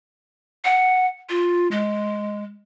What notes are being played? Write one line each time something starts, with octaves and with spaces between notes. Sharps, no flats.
F#5
F4
G#3